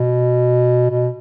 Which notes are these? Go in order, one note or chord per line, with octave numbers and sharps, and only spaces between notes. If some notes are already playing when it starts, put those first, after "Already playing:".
Already playing: B2
B2